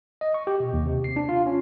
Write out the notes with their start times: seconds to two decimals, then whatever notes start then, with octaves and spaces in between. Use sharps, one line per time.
0.21 D#5
0.34 C#6
0.47 G4
0.60 B2
0.73 D#2
0.86 C3
1.04 C7
1.16 D4
1.29 F4
1.46 C#4